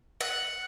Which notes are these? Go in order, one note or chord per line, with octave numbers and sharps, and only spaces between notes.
F#5